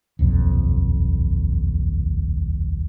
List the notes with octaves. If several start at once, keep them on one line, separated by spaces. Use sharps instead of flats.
D#1 B1 F2